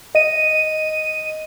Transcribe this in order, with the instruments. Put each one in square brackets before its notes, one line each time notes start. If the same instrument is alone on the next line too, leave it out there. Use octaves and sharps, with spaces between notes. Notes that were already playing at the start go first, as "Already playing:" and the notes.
[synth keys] D#5 D#7